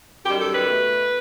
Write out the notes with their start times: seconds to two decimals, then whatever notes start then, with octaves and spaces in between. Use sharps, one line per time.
0.25 F#2 D#3 G3 G4
0.39 A4
0.53 B4
0.67 B2 A3